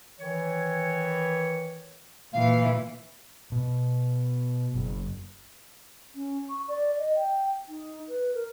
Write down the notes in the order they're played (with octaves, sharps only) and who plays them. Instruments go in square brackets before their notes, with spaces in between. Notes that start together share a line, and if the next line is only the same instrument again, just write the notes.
[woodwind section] D#3 E3 C#5
[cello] A#2 E3 [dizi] F5
[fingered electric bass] B2
F#1
[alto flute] C#4
C#6
D5
D#5
G5
D#4
B4
A#4